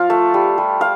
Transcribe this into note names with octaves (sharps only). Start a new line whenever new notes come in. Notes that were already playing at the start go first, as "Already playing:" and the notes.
Already playing: F3 F4 F5
A3
G3
G3
F5